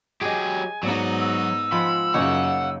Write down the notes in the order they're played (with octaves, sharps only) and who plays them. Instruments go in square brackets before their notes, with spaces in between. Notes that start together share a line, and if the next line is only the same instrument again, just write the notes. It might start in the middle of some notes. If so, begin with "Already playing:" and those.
[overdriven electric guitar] F#3 G4 [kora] G#4 D#5 [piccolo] G#5
[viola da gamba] G#2 B3 D#4 [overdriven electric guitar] F#3 [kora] D5
[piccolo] E6
[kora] F3 G#3 F#5 [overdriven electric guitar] B5
[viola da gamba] F#2 C#3 [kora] A#3 C#4 D#4 [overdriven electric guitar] F#5